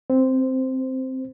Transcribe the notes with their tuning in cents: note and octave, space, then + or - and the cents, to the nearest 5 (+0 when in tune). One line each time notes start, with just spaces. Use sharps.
C4 +0 C5 -10